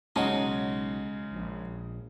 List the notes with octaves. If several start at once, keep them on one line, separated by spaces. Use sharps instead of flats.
B1 C#3 G#3 C#4 D#4 F#4
A#1